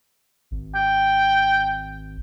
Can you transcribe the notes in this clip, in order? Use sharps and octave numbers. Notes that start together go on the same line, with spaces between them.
G#1
G5